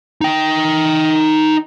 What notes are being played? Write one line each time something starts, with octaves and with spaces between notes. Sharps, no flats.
D#4 G5